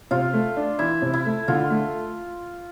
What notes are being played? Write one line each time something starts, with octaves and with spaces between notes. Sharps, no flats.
C3 F4
A3
D4
E3 E4
C3
E4
A3
D3 F4
A3